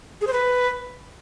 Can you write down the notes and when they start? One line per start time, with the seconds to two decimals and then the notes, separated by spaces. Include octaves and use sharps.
0.21 G#4
0.27 C5
0.33 B4